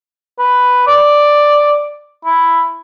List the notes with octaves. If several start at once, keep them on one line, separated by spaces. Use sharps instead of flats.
B4
D5
E4